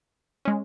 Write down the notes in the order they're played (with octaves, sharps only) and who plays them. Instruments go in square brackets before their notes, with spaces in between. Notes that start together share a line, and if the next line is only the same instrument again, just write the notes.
[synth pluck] G#3 C#4